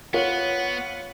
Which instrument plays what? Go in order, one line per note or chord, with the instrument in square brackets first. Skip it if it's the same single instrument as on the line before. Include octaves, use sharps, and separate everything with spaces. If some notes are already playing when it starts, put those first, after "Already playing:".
[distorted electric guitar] B3 [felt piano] F4 C#5 [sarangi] F#5